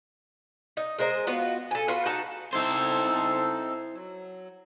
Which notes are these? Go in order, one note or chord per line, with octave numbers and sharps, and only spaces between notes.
D#4
G#3 A#4 C5 D#5
B3 F4 F#4
A4 G#5
F4 F#4 B4
D#4 F#4 A5
C4 D#4 E4 A4 C5
F#3